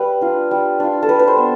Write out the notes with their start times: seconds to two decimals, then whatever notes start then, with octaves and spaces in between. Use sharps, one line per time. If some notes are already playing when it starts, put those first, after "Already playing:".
Already playing: G3 B4
0.21 D4 F4
0.51 G3
0.80 D4 F4
1.03 A4
1.08 G3 B4
1.19 B4
1.28 C5
1.37 B3 D4